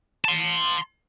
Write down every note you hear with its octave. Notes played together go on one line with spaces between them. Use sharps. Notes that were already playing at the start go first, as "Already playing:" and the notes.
A5 C6